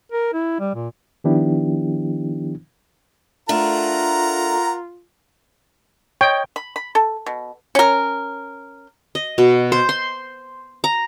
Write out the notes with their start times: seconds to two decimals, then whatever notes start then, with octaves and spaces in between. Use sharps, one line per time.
0.12 A#4
0.33 E4
0.60 G3
0.75 A#2
1.24 D#3 F3 B3 D4 E4 G4
3.49 A3 D4 F4 A#4 F#5 A#5
6.21 C#5 D#5 G5
6.56 B5
6.76 B5
6.95 A4
7.26 B2
7.75 C#4 A#4
9.15 D#5
9.38 B2
9.72 C5
9.89 C6
10.84 A#5